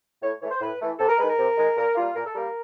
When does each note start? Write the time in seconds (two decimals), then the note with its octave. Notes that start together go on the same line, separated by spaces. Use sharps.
0.22 A2 C#5
0.41 E3 A3 C#5
0.51 C5
0.60 A2 B4
0.80 E3 A3
0.99 C3 A4
1.09 A#4
1.18 D#3 G#3 B4
1.28 A#4
1.38 C3
1.57 D#3 G#3
1.77 A#2 A#4
1.96 G3 A#3 F4
2.15 A#2 A#4
2.25 A4
2.34 G3 A#3 A#4